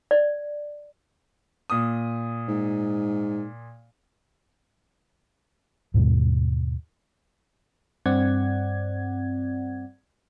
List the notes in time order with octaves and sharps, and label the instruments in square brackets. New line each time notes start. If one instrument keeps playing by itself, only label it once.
[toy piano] D5
[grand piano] A#2 D#6
[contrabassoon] G#2
[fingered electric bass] D#2 G#2 B2 G3
[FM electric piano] G2 C4 D5 F#5 G#6